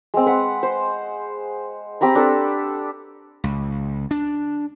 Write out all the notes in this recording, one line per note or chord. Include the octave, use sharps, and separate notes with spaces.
G#3 C4
B4 F#5
C5
C4 G4 A#5 B5
D4 A4 B4
C#2
D4